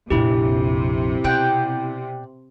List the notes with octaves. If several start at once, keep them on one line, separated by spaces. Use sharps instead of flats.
A#1 F2 C3 E4 G4
B2 D5 F#5 G5